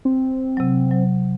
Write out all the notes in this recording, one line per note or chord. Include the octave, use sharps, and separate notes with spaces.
C4
C3 F#3
F#3